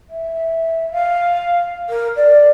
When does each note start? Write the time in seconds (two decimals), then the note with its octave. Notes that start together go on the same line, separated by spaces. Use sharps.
0.10 E5
0.92 F5
1.89 A#4
2.16 D5